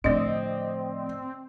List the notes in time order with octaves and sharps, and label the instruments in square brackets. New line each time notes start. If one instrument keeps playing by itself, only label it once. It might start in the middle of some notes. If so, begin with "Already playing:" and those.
[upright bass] A2 F3 [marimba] D3 A3 D4 [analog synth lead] C4 [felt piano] D5 D#5